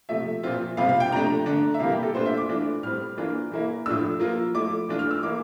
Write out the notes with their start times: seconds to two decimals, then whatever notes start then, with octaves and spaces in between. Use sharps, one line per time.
0.09 C3 F3 A3 E5
0.43 A#2 F3 C4 F4
0.77 C3 G3 C4 F4 F5
0.89 F5
1.00 G5
1.11 C3 F3 A3 D4 A#5
1.46 D3 A3 D4
1.74 E5
1.80 C3 E3 G3 A#3 F5
1.92 G4
2.03 A4
2.14 A#2 A3 D4 F4 C5
2.26 E5
2.37 D6
2.49 E3 A3 D4 F4
2.83 A2 G3 C4 F6
3.17 E3 A#3 D4 F4
3.52 E3 A#3 E4
3.86 A2 F3 A3 D4 E6
4.20 F3 A#3 F4
4.54 F3 A3 E4 D6
4.88 E3 A3 D4 F4
4.99 F6
5.11 E6
5.23 E3 A#3 E4 D6